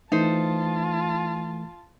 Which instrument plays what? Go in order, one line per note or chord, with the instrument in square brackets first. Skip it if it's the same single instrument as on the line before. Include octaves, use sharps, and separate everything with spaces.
[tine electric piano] E3 A3 [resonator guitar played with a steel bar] D#4 C5 [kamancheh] F4 A5